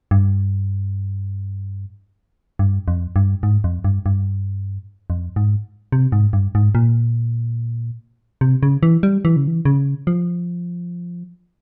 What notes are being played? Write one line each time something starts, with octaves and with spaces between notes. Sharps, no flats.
G2
G2
F2
G2
G#2
F2
G2
G2
F2
G#2
C3
G#2
G2
G#2
A#2
C3
C#3
E3
G3
E3
C#3
E3
C#3
F3